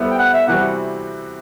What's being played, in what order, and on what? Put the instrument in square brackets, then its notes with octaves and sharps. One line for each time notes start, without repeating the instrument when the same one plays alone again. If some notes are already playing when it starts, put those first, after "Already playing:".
Already playing: [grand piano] G3 B3 E4 A4 C5
[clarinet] G5
F#5
E5
[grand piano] C3 E3 G3 C4 F#4 [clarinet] F#5